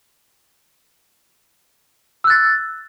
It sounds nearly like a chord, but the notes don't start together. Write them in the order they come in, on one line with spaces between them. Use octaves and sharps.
E6 F#6 A6